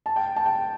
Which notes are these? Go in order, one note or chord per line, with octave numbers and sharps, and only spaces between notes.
A5
G5
A5
G5